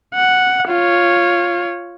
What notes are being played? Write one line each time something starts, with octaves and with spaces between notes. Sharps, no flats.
F#5
F4 C#5